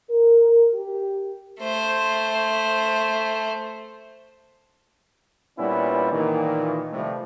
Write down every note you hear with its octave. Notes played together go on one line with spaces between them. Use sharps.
A#4
G4
A3 C5
A#2 G3 B3 C#4 D4 E4
A#2 D#3 E3
C3 F3 G3 A3